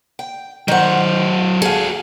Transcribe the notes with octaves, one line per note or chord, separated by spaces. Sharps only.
G5
D#3 F#3 C5 F#5
F#4 G#4 A4 F5